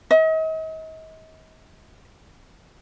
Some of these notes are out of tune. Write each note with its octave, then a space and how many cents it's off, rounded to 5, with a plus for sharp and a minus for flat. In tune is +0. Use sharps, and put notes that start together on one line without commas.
D#5 +40